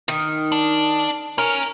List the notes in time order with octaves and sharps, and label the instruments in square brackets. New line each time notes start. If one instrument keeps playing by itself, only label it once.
[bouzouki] D#3
[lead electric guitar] D4
[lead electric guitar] C#4 [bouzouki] A#4